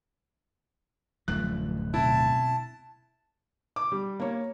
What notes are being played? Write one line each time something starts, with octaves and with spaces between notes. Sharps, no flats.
D1 F#2 F3 A3 F#6
B2 C4 E4 A5
D6
G3
A#3 C#5